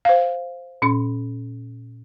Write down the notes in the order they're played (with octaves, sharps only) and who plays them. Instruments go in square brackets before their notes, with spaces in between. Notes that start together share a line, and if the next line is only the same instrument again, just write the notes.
[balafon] C5 F5
[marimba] A#2 C#4 C6